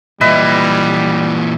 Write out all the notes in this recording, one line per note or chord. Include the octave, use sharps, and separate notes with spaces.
A#2 E3 G3 B4 D#5 E5